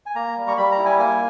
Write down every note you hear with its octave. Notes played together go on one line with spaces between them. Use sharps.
G#5
A#3 A#5
G3
C#6
G3 B5
A#5
E4
G#5
A#3 G#5